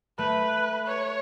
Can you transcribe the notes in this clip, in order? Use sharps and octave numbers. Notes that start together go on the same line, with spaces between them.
A3 B4
C#5